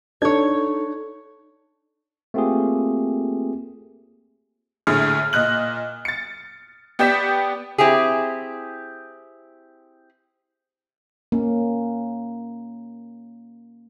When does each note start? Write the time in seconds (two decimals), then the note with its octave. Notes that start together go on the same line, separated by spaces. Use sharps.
0.22 D4 D#4 A4 C#5 G#6
2.34 A3 A#3 C4 F4 G4 G#4
4.87 A#1 A2 D3 G#4 F6
5.33 A#2 D#5 F#6 F#7
6.05 A6 C#7
6.99 B3 G4 D5 G6 B6 E7
7.78 C4 E4 G4 G#4
11.32 A#3 C#4